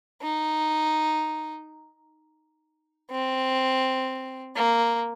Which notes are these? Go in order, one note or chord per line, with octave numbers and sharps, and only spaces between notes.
D#4
C4
A#3